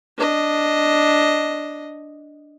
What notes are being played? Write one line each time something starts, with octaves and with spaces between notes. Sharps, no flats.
D4 D#5